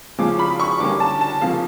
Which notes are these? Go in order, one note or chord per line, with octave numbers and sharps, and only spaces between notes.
F2 C#3 F3 G#3 C#4 D6
B5
C#6
D3 G3 A#3 C#4 D6
A5
A5
F2 C#3 F3 A#3 F5